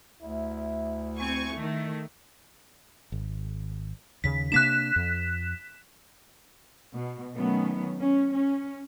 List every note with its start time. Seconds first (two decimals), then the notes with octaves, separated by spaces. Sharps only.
0.22 D2 E4
1.19 C4 G#5 C#6
1.55 D#3 A3
3.12 G#1
4.24 D#2 C#3 B6
4.52 C3 A#3 D4 F#6 B6 E7
4.96 F2
6.94 B2
7.35 D#3 F#3 A3 B3 C#4
8.00 C#4
8.34 C#4